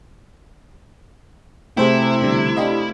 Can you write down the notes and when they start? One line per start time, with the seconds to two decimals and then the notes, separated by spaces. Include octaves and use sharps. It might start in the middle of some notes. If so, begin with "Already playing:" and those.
1.77 C3 A3 E4 G#4 C5 G5
2.22 B2 D3 G3
2.57 D4 G4 D#5 F5 B5